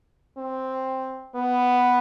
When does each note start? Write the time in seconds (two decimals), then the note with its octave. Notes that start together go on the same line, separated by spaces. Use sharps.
0.38 C4
1.35 B3